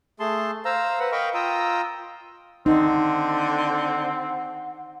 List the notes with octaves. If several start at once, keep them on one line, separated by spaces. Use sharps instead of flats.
A3 G#4 A5 C6
C5 F5 A#5 E6
B4 F#5
A#4 D#5 F5 G5 B5 C#6
F4 G5 A#5 D#6 E6
D3 C4 D#4 F#5